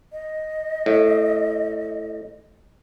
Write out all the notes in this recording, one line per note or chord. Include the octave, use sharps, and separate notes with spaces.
D#5
A2